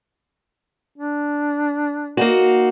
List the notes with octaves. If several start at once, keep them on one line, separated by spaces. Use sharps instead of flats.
D4
A#3 D#4 F#4